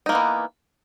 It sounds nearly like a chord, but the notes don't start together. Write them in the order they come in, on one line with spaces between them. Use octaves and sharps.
D#4 A#3 B3 E3